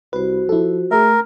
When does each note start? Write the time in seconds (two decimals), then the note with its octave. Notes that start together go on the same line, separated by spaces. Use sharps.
0.13 C2 F#4 B4 C5
0.49 F3 E4 A4
0.91 A3 G#4 A#4 E5